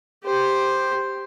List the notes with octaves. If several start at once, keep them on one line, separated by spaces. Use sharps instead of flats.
G4 C5